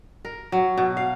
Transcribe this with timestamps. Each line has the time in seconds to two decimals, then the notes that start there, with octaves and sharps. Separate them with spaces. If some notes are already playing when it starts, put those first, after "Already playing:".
0.25 A#4
0.52 F#3
0.78 B2
0.97 F5